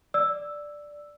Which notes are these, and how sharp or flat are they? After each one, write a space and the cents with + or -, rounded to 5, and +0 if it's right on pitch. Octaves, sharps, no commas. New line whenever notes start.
D5 +0 E6 +0